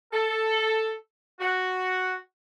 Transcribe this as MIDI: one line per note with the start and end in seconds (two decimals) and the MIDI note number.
0.12 0.92 69
1.40 2.14 66